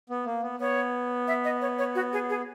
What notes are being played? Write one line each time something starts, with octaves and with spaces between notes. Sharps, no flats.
B3
A#3
B3
B3 C#5
E5
D#5
C#5
C#5
F#4
G#4
G#4